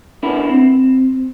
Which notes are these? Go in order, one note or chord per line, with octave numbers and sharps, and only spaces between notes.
B3 C#4 D4 E4 A#4
C4